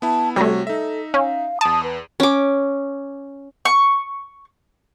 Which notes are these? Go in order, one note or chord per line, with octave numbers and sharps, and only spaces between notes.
B3 E4 A5
C3 G3 A3 F#4 C#5 A#6
D#4 A4 E5
C#4 F5
E2 A5 D#6 D7 D#7
B4
C#4 D6
C#6